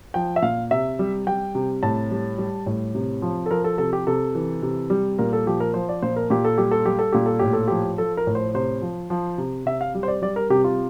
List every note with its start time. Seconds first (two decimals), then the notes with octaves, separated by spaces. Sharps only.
0.14 F3 G5
0.36 E5
0.42 A#2 F5
0.71 C3 E5
0.99 G3
1.27 G3 G5
1.55 C3
1.83 A2 A5
2.11 G3
2.38 G3
2.66 A2
2.95 C3
3.22 F3
3.46 A4
3.51 F3 A#4
3.64 A4
3.78 C3 A4
3.93 G4
4.07 C3 A4
4.35 E3
4.62 C3
4.90 G3
5.19 A#2 A#4
5.33 A4
5.47 F3 G4
5.60 A#4
5.74 F3 C5
5.89 D5
6.02 A#2 C5
6.16 A#4
6.30 A#2 G4
6.45 A4
6.58 G3 G4
6.71 A4
6.86 G3 G4
6.99 A4
7.12 A#2 G4
7.26 A4
7.39 A2 G4
7.53 A4
7.68 F3 G4
7.98 F3 A4
8.17 A#4
8.27 A2
8.35 C5
8.54 C3 C5
8.82 F3
9.10 F3
9.38 C3
9.66 C3 E5
9.81 F5
9.95 G3
10.03 C5
10.08 D5
10.22 G3 D5
10.36 A#4
10.50 C3 G4
10.64 F4